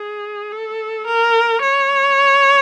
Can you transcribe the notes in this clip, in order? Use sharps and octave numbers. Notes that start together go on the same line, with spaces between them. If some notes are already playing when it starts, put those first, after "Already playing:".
Already playing: G#4
A4
A#4
C#5